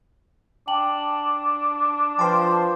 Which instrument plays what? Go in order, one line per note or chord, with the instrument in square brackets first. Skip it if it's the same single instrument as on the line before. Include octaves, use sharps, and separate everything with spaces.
[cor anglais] D4 [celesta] G5 A5 F#7
[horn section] F3 C5 [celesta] B4 G5 [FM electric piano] A5 C6